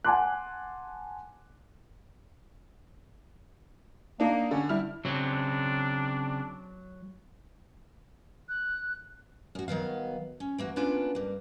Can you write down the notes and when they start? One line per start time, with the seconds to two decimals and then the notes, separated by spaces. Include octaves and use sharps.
0.04 F#5 G#5 A5 C6 D6 F#6
4.20 A#3 D4 D#4
4.51 D3 C#4
4.69 G3 E4 F6
5.05 C#3 F#3 C4 D4
8.49 F#6
9.55 F#2 F#4
9.68 D#3 F#3 B3 F5
10.40 C#4
10.58 E3 A#3 F#4
10.76 A#3 B3 C#4 D4 F4 B4
11.15 G2 A#3